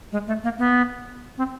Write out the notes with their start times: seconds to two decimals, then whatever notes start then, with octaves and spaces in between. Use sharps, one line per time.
0.12 G#3
0.27 A3
0.44 A#3
0.59 B3
1.38 C4